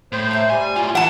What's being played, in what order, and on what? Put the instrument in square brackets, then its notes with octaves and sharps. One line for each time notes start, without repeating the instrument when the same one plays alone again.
[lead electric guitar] A2 [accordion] C5
[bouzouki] E5 A#5
[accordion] G3 [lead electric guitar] G#5
[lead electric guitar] A2 F4 [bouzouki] F#3
[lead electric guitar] E3 [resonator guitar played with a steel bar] F#5 A5